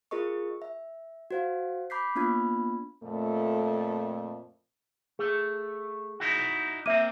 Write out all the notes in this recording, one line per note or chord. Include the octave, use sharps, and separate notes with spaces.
F4 G#4 A#4 D#5 C#6
E5
F#4 C5 F5
B5 D6 G6 B6 C7
A#3 B3 D4 F4 B5 G#6
F2 A#2 A3
A3 G#4
D#4 E4 F#4
A#3 C4 E5 D#7